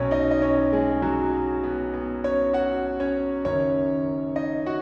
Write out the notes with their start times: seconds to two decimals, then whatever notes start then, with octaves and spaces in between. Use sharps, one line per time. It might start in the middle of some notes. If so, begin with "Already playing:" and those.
Already playing: B1 B2 C#4 C#5
0.11 D#4 D#5
0.31 D#5
0.42 C#4 C#5
0.73 G#3 G#4
1.02 F#3 F#4
1.64 B3
1.94 B3
2.24 C#4 C#5
2.53 F#4 F#5
3.00 C#4 C#5
3.45 F#1 F#2 D#3 C#4 C#5
4.36 D#4 D#5
4.66 F#4 F#5